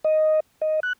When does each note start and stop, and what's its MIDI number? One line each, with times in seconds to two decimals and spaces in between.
0.04 0.40 75
0.61 0.80 75
0.83 0.93 90